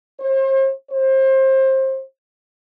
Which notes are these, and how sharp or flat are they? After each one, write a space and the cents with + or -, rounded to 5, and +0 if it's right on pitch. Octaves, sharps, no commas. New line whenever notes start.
C5 +40
C5 +25